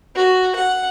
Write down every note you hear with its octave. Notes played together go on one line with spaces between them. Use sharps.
F#4
F#5